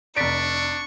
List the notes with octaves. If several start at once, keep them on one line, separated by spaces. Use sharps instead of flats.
F1 D4 D5 C#6 A6 B6 D7